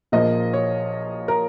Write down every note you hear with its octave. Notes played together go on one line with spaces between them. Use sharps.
A#1 A#2 F3 A#3 D#5
C#5
A#4